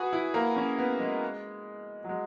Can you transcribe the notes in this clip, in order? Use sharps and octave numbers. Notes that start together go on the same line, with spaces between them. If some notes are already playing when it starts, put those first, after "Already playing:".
Already playing: F#4 G#4 B4
E4
A#3
C#4
B3
G#3
F#3
G#3